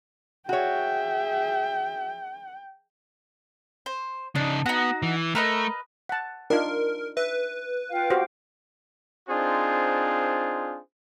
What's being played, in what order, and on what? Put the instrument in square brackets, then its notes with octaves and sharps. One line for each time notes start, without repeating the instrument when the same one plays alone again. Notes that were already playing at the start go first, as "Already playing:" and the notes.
[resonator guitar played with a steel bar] F#4 C#5 [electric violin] G#4 E5 [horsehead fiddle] G5
[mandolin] C5
[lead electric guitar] C#3 D#4 [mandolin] D4
[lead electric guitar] B3 [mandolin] D#4 F#4
[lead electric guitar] E3
[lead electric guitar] A3 [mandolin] A#4 B4 D#5
[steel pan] F#5 A5
[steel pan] D4 D#4 F4 [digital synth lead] A#4
[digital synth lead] B4 [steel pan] E5
[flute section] F4 F5 G5
[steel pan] F#4 G4 C5
[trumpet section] C4 D4 D#4 F4 G#4 C5